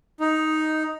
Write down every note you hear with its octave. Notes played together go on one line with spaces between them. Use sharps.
D#4